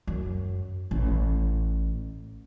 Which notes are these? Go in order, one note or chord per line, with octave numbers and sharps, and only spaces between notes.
F#2
A1